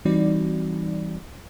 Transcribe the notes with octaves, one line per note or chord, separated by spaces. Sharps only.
E3 G3 C4 D#4 F#4 D5